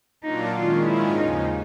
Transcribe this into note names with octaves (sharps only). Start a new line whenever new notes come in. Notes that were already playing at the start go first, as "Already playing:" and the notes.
A#2 F#3 A#3 D4 D#4 F4
D#3 G#3 C#4 F4
G#2 D#3 G#3 C#4 E4 F4
D#2 C#3 F3 D#4